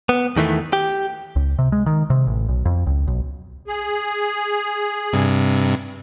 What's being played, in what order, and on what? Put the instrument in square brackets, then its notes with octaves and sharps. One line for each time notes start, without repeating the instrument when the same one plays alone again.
[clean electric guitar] B3
E2 D#3 E3 A3
G4
[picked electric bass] C#2
C3
G#3
D#3
C3
A1
B1
F2
C#2
B1
[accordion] G#4
[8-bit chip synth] G2 C3